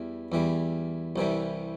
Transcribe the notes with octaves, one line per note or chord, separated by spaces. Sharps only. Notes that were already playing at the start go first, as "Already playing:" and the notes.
Already playing: E2 E3 G3
E2 E3 G3
C2 C3 E3 G3